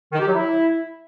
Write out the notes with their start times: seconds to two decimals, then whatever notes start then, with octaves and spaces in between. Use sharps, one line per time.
0.13 D#3
0.20 G4
0.27 F#3
0.35 E4